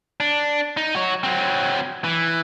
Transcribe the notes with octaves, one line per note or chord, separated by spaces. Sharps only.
D4
D#4
F#4 C#5
F#3 C4
E3